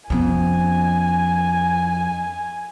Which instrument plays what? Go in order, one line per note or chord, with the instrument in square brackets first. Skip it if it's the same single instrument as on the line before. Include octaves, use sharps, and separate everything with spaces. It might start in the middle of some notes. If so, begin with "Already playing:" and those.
[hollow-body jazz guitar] F2 [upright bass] B3 C#4 [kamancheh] G#5